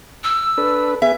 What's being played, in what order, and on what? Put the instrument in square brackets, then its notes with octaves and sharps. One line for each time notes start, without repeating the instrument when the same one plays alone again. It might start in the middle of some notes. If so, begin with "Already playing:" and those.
[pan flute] E6
[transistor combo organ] D4 A4 B4
[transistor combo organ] B3 G#4 [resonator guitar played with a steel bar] E5